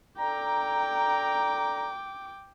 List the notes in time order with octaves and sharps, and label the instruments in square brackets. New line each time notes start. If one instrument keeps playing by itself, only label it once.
[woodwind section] D4 A4 A#5 [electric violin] G5 D6